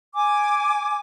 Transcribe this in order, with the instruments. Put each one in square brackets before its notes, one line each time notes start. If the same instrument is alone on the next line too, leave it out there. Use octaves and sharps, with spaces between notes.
[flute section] G#5 D6